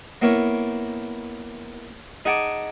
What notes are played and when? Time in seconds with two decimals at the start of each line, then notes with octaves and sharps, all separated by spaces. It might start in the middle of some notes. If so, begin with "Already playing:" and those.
0.22 A#3 B3 E4 A#4 C#5
2.25 D#4 G#4 F#5 G#5 A5 D6